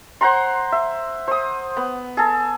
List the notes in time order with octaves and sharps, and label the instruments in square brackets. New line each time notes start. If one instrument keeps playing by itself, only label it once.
[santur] C5 F#5 A#5 C6
E5
C5 D#6
B3
G#4 A4